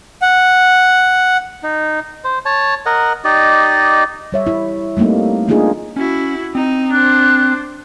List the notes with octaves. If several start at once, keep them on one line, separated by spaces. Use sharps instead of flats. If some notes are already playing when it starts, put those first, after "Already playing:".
F#5
D#4
C5
C#5 A5
A#4 D#5 F#5
D#4 G4 D5 D#5
G3 C#5 E5
E4
G3 A3 A#3 C4 D#4
A3 A#3 D4 D#4 F4 G#4
C#4 E4 F#4
C4 D#4
D4 C5 F#6